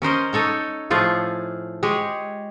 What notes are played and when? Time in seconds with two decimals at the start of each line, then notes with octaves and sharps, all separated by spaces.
0.02 C#4 A#4 C5 D#5
0.33 D#4 A4 C#5 A#5
0.90 A2 F3 A3 F4 G#4
1.83 G#3 G4 G#4 C#5